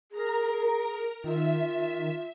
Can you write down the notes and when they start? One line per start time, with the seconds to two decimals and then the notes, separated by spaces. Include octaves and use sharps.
0.12 G#4 A#4 A#5
1.24 D#3 F4 E5